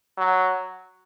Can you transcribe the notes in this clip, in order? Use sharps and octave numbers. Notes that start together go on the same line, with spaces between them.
F#3